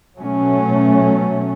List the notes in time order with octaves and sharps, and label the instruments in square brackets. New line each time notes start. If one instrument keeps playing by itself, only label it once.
[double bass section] B2 F#3 A3 C#4